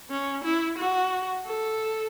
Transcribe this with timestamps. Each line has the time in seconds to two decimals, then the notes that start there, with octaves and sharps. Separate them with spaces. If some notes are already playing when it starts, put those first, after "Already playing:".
0.11 C#4
0.44 E4
0.78 F#4
1.46 A4